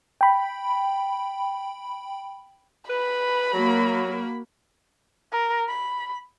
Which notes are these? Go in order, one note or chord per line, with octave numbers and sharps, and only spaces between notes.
G5 B5
B4 B5
F#3 A#3 F#4 A#4
A#4
B5